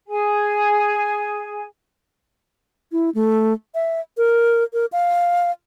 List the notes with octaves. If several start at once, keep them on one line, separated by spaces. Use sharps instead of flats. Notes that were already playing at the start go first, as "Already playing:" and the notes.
G#4 G#5
E4
A3
E5
A#4
A#4
F5